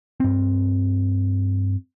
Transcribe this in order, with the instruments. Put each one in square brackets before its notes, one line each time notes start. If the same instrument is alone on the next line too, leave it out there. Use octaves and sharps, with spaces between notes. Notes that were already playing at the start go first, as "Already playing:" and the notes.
[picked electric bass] G2 C4